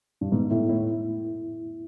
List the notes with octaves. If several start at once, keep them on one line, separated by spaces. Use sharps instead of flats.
G2
G#2 B3
A2 E4
A2 E4